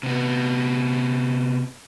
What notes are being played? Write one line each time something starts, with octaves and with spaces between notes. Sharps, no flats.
C3 B3